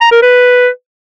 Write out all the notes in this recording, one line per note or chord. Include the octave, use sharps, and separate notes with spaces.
A#5
A#4
B4